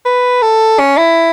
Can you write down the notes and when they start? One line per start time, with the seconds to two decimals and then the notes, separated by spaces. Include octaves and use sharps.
0.06 B4
0.42 A4
0.79 C#4
0.97 E4